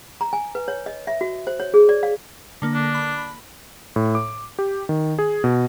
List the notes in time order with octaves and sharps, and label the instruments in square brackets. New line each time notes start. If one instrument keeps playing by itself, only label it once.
[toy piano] A#5
G#5
B4
C#5
D#5
E5
F#4
C5
C#5
G#4
D5
F5
[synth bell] D3 A#3
[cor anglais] D4
[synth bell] B5
[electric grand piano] A2
D6
G4
D#3
G#4
B2